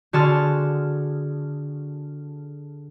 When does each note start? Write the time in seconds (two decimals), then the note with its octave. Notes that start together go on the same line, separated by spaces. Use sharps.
0.13 D3 F#4 G#4 A5 C6 F6